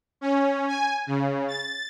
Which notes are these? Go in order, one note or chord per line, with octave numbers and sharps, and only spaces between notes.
C#4
G#5
C#3
A6